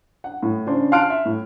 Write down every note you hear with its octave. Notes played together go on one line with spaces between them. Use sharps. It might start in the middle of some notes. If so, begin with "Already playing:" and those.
F#5
A2
C#3 D4 C5
F5 A5 C6 F6 F#6 D7
E5
A2